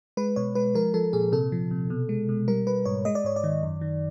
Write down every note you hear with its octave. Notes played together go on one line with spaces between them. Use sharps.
G#3 B4
B2 C#5
G#3 B4
F3 A#4
F3 A4
A#2 G#4
C3 A4
F3
C3
B2
G#3
B2
G3 A#4
G3 B4
G#2 C#5
G#3 D#5
D5
G#2 C#5
D5
D#3
F#2
D#3